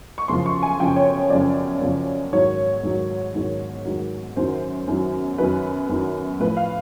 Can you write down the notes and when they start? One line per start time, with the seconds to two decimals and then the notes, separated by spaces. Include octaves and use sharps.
0.18 C#6
0.28 F#2 C#3 F3 C6
0.46 C#6
0.63 G#5
0.79 F#2 C#3 F3 G5
0.96 C#5
1.30 F#2 C#3 F3 D5
1.81 F#2 C#3 F3
2.32 G#2 D#3 F#3 C#5
2.83 G#2 D#3 F#3
3.34 G#2 D#3 F#3
3.85 G#2 D#3 F#3
4.36 F#2 D#3 F#3 C5
4.88 F#2 D#3 F#3
5.38 F#2 D#3 F#3 B4
5.89 F#2 D#3 F#3
6.40 A2 F3 B4
6.57 F5